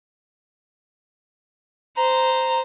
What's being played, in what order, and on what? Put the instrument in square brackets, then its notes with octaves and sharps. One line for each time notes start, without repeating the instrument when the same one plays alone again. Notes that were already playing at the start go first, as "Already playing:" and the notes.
[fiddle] C5 [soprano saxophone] A#5